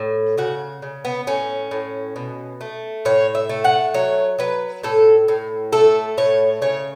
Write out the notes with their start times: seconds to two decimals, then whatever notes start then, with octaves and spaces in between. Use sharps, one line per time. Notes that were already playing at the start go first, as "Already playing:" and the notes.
Already playing: A2
0.38 C#3 F#4
0.82 C#3
1.05 B3
1.27 A2 C#4
1.71 A2
2.16 B2
2.61 A3
3.05 A2 C#5
3.35 E5
3.49 A3
3.64 F#5
3.94 F#3 C#5
4.39 F#3 B4
4.83 A2 A4
5.28 A2
5.73 A3 A4
6.18 A2 C#5
6.62 C#3 C#5